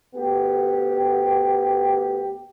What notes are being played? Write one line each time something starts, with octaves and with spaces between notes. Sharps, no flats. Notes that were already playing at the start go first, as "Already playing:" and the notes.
D2 B3 G4